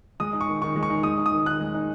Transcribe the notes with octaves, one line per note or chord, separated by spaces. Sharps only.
G#3 D#6
D#4
C#6
D#3
D#3 C#6
G#3
C#6
D#4
G#3 D#6
D#4
D#6
D#3
D#3 F#6
G#3
D#4